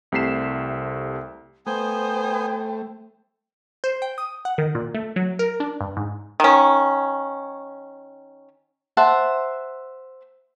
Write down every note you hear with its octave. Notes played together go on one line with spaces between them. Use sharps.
C2 C3 A3 B6 C7 E7
A3 B3 C5 G5 G#5 D#6
C5
G5
D#6
F#5
D#3
A#2
A3
F#3
A#4
D4
G2
G#2
D#3 C#4
C5 E5 F#5 A5